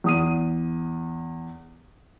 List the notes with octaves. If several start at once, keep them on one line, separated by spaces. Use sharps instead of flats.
E2 D#6 D#7